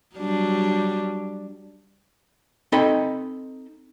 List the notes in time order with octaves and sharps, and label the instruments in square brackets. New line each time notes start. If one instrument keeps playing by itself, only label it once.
[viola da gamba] F#3 G3 D4
[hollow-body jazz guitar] C4 D#4 A4 D#5 B5